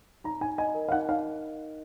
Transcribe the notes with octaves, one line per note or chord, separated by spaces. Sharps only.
D#4 A#5
D#4 G#5
D#5 G#5
A#4
F5
D#4 F#5
D#4 F5